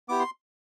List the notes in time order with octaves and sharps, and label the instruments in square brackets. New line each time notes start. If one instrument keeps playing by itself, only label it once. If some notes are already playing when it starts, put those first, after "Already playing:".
[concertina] B3 E4 G4 D6
C6